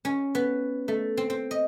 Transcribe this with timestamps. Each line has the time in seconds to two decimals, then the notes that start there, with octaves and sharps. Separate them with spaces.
0.05 C#4
0.35 B3
0.88 A3
1.17 C4
1.30 C4
1.51 D#5